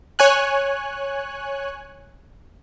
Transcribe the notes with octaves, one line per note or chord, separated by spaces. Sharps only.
C#5 G#5 F#6